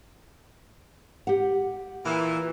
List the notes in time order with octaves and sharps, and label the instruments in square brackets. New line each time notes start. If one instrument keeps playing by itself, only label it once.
[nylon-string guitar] G4 F#5
[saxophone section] A#2 E3